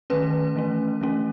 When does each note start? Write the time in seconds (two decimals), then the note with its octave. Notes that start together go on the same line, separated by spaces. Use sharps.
0.10 D#3 A3 C#4 B4
0.55 E3 A3 C#4
1.01 E3 A3 C#4